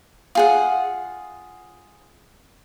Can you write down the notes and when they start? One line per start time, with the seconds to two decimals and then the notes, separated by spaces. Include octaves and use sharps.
0.35 F4 G#4 F#5